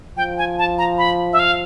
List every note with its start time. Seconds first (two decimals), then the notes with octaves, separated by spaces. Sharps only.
0.17 F3 G5
0.38 G#5
0.58 A5
0.78 A#5
0.98 B5
1.33 E5
1.39 F5